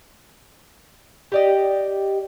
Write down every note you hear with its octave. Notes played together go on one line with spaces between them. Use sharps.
G4 D5 D#5